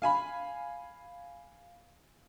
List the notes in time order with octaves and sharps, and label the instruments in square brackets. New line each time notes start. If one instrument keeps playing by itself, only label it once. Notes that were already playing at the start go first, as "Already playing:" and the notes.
[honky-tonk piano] F5 G#5 B5